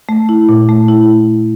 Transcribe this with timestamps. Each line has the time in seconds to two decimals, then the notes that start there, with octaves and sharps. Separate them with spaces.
0.09 A3
0.29 E4
0.49 A#2
0.69 A3
0.88 E4